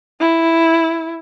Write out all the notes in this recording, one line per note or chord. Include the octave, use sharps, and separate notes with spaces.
E4